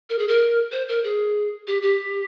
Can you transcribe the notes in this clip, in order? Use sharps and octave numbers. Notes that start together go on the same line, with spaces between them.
A#4
G#4
A#4
C5
A#4
G#4
G4
G4